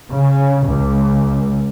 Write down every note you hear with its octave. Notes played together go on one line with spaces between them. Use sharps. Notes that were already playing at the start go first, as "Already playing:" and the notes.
C#3
C#2